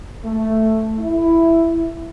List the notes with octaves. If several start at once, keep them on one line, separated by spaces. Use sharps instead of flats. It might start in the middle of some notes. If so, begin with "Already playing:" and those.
A3
E4